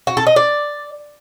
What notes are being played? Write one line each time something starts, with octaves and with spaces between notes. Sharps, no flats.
F#4
A4
D#5
D5